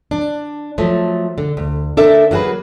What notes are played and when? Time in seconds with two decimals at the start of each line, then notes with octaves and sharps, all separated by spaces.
0.11 D4
0.78 F3 F#3 A3
1.38 D3
1.57 D2
1.97 D4 A4 A#4 E5
2.31 F#3 A#3 F#4 G#4 B4